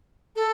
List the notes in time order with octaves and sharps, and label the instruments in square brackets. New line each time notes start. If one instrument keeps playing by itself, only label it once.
[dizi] A4